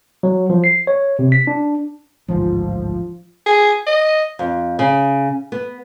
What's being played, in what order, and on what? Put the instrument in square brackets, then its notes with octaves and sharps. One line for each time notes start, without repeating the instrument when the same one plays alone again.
[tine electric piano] F#3
F3
C7
C#5
C3
B6
D4
[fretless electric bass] A1 D2 G#2 [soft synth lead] F3
[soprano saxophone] G#4
D#5
[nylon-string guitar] F2
C#3
B3